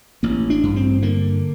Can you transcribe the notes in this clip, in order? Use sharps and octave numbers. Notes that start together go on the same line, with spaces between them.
A1 A#3
D4
G2
C4
D3 A#3